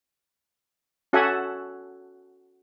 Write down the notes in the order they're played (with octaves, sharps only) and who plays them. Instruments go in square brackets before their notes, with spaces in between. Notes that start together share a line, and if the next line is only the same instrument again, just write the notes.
[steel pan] C#4 F#4 A4 E5 F#5 G#5